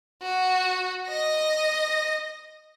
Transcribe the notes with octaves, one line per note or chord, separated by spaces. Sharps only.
F#4
D#5 A#6